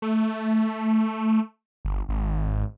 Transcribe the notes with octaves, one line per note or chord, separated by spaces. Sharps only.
A3
G1
G#1